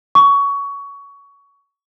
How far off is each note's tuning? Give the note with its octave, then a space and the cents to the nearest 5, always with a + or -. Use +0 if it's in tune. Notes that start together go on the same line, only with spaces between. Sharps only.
C#6 +20